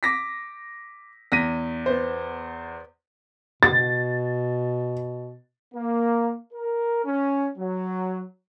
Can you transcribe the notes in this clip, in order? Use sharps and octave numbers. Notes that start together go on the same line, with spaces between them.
D6 A#6 B6
E2 A#6 B6 D#7
B3 C5
B2 A6
A#3
A#4
C#4
F#3